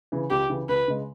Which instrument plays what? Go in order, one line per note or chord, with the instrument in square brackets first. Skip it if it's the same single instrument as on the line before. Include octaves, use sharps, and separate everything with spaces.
[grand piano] C#3 E3
[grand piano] C#2 [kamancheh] G4
[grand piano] C#3 E3
[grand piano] C#2 [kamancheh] B4
[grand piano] C#3 G#3